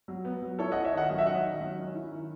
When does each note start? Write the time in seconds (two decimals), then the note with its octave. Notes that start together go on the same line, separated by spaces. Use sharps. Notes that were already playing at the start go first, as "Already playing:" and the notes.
0.08 F#3
0.25 B3
0.42 F#3
0.59 E4 A4 C#5
0.72 C#4 D#5 F#5
0.85 C#5 E5
0.93 D#3 D#5 F#5
1.10 F#3 F#5
1.18 E5
1.26 C#4 D#5 F#5
1.44 D#3
1.60 F#3
1.78 C#4
1.95 E4
2.12 D#3